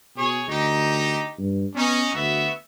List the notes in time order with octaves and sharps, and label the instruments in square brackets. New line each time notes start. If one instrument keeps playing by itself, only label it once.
[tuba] B2 [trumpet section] G#4 C#5
[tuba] D2 [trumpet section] D#4 G4
[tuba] G2
[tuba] B3 [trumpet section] C#4 D#4
[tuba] D2 [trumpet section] B3 F#4 E5